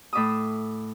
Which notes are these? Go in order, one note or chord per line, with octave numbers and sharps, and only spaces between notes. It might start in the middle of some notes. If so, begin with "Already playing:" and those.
A2 E5 D6 D#6